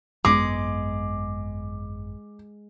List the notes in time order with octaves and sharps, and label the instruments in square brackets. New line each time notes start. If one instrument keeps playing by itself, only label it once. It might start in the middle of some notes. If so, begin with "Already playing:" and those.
[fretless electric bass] G#1 F#2 B3 [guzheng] G#3 [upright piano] D6